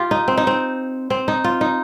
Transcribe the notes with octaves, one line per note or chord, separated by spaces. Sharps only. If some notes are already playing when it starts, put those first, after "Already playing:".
Already playing: F4 G4
D#4
C4
D#4
C4
C4
D#4
F4
D#4